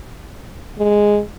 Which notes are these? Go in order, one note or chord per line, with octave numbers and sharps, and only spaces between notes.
G#3